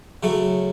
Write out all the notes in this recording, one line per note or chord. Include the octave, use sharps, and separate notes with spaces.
C#3 F#3 A3 E4